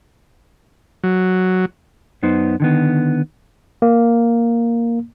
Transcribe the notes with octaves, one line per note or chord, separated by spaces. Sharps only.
F#3
F#2 B3 D#4 C5
D3 D#3 B3
A#3